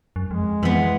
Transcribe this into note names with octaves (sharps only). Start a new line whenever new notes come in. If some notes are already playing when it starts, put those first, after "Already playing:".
F#2
F2 G#3
F2 E3 B3